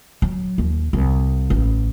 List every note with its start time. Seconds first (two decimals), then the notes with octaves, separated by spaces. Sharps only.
0.22 F#3
0.58 D#2
0.93 C2
1.50 A1